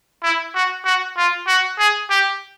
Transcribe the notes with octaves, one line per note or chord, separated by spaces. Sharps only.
E4
F#4
F#4
F4
F#4
G#4
G4